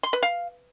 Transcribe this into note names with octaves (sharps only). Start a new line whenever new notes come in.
C6
B4
F5